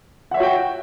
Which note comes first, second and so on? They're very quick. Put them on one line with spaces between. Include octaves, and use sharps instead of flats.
F#5 E5 C#5 F#4 G5